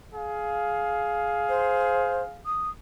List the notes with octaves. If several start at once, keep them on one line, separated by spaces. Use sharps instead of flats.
G#4 F5
C5
D#6